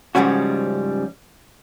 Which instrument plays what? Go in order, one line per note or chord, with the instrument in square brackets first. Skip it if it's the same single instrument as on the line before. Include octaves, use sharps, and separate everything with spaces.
[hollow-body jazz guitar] G#2 C#3 F3 G3 C#4 F#4